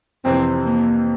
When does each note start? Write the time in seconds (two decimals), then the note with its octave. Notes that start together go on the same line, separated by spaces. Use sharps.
0.25 F2 C3 E3 C4
0.65 A#3